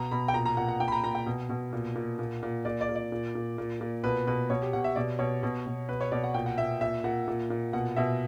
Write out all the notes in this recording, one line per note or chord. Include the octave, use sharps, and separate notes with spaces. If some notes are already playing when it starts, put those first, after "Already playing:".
Already playing: B2 A#5
B2 B5
G5
A#2 A#5
A#5
A#2 F#5
F#5
A#2 G5
B5
A#5
A#2 A#5
G5
B2
B2
A#2
A#2
A#2
A#2
A#2 D5
D5
A#2
D5
A#2
A#2
A#2
A#2
B2 B4
B2 B4
B2 C#5
G4
B2 F#5
E5
B2 D5
B2 C#5
B2
B2
B2 B4
C#5
B2 D5
F#5
A#2 G5
F#5
A#2 E5
A#2 E5
A#2 F#5
A#2
A#2
B2 F#5
B2 E5